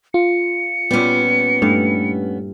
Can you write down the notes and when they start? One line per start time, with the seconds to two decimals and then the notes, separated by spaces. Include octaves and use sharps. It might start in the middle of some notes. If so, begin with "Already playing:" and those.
0.14 F4 C#7
0.91 A#2 G3 B3 C#4
1.62 G2 A3 E4 F5